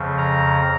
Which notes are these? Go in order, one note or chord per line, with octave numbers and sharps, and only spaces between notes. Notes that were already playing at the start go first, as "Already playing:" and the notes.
Already playing: F2 C#3 F3
A#5